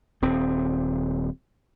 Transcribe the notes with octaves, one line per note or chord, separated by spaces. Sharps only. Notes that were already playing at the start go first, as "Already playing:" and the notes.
D#1 C4